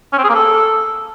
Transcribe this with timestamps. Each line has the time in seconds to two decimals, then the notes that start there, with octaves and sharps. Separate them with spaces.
0.13 C#4
0.18 C4
0.24 G#4
0.29 A#3
0.35 A4